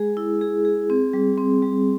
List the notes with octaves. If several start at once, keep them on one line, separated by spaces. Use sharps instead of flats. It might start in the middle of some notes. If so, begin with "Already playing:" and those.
Already playing: G#3 G#4
E4
G#4
G#4
C4
G3
C4
G3